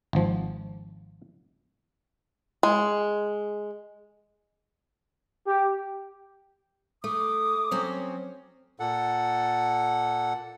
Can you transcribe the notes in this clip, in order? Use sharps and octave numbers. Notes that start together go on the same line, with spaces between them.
G#1 F3
G#3
G4
A3 D6 D#6
F#3 C4 C#4
A#2 A4 F#5